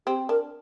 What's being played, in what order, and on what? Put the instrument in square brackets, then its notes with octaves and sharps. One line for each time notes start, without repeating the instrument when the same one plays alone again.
[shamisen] C4 [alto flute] G4
[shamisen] D4 [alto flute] A#4